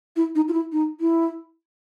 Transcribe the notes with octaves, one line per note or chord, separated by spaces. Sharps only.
E4
D#4
F4
E4
D#4
E4